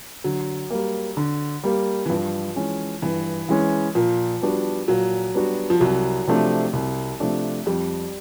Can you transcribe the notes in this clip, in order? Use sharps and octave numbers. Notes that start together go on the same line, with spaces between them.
D3 F#3
G3 A#3
D3
G3 A#3
E3
G2 F3
E3 G#3 C#4
G2 E3
E3 G#3 C#4
A#2 F3
G3 B3 D4 F#4
A#2 F#3
G3 B3 D4 F#4
F3
C2 F#3
C3 F3 A3 D4
C2
C3 F3 A3 D4
F2 G3